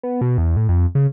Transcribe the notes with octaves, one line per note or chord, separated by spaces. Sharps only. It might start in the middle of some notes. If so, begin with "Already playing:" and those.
B3
B2
E2
A2
F2
C#3